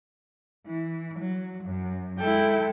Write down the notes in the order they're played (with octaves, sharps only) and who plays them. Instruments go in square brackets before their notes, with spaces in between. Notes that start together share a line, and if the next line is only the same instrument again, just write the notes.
[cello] E3
F#3
F#2
[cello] G#3 A4 [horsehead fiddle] E4 G5